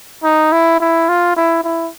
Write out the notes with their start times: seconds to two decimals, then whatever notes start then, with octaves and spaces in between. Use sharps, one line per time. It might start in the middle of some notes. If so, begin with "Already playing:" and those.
0.24 D#4
0.52 E4
0.80 E4
1.09 F4
1.37 E4
1.64 E4